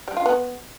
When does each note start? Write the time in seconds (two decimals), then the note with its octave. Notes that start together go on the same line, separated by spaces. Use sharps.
0.08 G3
0.17 F4
0.26 B3